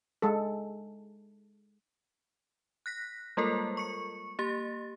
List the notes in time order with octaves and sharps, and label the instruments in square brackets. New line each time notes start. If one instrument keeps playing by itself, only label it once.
[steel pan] G#3 A4
[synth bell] F#6 A#6 B6
G3 G#3 A#3 F4 A4 A#4
C#6 C#7
A#3 G4 A6